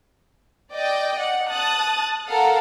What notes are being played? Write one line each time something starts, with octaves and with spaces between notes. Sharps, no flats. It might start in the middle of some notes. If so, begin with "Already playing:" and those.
D5 D#5 G5
F#5
A5 D#6 F#6 A6
A4 A#4 F5 F#5